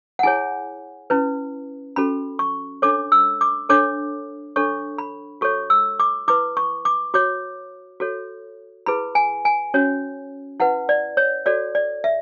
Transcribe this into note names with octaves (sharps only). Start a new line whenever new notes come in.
F#5
E4 G#4 C#5 G#5
C#4 E4 B4
C#4 F#4 A4 B5
C#6
D4 A4 C#5 D6
E6
D6
D4 A4 C#5 D6
D4 A4 C#5 C#6
B5
F#4 A4 C#5 C#6
E6
D6
E4 B4 D6
C#6
D6
F#4 C#5 D6
F#4 A4 C#5
E4 G#4 B4 B5
G#5
G#5
C#4 F#4 C#5
E4 B4 F#5
D5
C#5
F#4 A4 C#5 D5
D5
E5